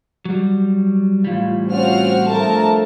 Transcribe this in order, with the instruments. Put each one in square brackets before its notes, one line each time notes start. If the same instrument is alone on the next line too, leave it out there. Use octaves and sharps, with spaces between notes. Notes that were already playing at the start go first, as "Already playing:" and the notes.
[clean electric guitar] F#3 G3
[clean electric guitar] A2 E3 G3 [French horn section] F4
[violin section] C4 F#4 F6 [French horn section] C#4 F4 C5
[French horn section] G2 F3 A3 [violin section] A#4 A5